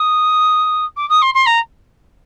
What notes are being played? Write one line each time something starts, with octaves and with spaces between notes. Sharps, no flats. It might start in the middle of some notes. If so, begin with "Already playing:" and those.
Already playing: D#6
D6
D#6
C6
C6
A#5